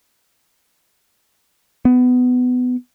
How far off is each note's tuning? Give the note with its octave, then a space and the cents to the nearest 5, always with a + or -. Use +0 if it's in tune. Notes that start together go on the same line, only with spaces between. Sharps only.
B3 +20